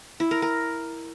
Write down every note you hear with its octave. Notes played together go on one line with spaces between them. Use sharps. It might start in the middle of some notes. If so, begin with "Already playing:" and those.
E4
A#4
A#4